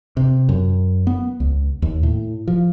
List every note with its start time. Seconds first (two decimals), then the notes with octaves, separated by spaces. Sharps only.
0.17 C3
0.49 F#2
1.07 B3
1.40 C#2
1.82 D#2
2.03 A2
2.48 F3